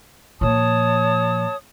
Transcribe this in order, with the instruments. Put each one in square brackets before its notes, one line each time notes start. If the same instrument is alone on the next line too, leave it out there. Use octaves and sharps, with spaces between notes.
[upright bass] A#2 F3 [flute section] C#5 A5 D#6